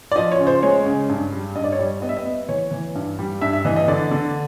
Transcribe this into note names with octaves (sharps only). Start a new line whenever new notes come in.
D5
F3 D#5
C#5
C#3
C5
G#3 C#5
C#3
G2
G3
G2 D#5
D5
C#5
G3 D5
B3 D#5
E5
D#5
B3
E3 C#5
E3
G2
G3
G2 E5
E5
E3 D#5
D#5
D3 D5
D3